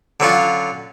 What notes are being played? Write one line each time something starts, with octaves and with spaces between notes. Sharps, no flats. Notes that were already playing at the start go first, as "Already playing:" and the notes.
D3 F#3 C#4 F4